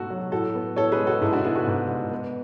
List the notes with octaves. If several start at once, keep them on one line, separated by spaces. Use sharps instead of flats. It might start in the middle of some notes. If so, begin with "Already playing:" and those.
Already playing: G#2 B2 A3 F#4 A4
F#3
A2 F#4 A4
B3
A2 A4 C#5
G#4 B4
G#3
F#4 A4
G#2 E4 G#4
D4 F#4
B3 E4 G#4
F#4 A4
G#2
G#3
B3